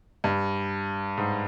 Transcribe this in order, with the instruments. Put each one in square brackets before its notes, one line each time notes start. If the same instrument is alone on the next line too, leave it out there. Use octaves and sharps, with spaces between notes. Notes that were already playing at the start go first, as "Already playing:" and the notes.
[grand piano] G2
G#2